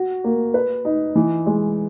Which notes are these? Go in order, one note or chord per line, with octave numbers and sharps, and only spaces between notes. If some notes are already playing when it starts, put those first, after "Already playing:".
Already playing: F#4
A#3
B4
D#4
E3
G#3